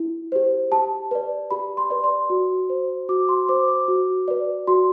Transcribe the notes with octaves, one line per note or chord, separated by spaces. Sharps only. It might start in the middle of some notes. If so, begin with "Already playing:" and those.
Already playing: E4
G4 C5
G4 A5
B4 D5
G4 B5
C6
B4 D5
C6
F#4
C5
F#4 D6
C6
C5 D6
D6
F#4
B4 D5
F#4 C6